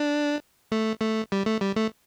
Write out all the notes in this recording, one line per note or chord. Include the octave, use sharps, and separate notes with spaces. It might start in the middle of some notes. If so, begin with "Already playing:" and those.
Already playing: D4
A3
A3
G3
A3
G3
A3